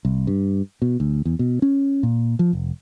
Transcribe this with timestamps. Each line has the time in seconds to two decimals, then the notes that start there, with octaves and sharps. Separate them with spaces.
0.05 C2
0.27 G2
0.82 B2
1.00 D2
1.25 E2
1.39 B2
1.62 C#4
2.03 A#2
2.39 F3
2.53 F1